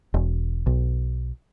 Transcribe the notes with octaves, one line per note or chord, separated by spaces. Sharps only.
E1
B1